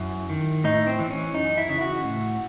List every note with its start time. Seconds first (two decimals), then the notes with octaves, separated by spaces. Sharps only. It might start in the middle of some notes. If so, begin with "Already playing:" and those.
Already playing: F#2 E4
0.29 D#3
0.64 A2 D#4
0.87 C4
0.99 E3
1.10 C#4
1.34 F#2 D#4
1.57 E4
1.69 C#3 E3
1.81 F#4
2.04 A2